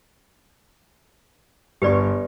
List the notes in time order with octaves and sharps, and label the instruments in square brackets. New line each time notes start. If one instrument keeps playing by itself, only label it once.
[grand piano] G1 C#6 [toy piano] G4 B4 D5